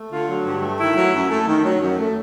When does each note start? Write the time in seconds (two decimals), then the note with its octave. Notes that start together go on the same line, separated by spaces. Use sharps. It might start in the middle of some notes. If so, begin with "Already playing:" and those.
Already playing: A3
0.10 D3 F4
0.27 F#3
0.45 G2
0.61 A3
0.78 D#3 E4
0.95 F#3
1.13 F#2
1.29 A3
1.47 D#3
1.63 F#3
1.80 F#2
1.97 A3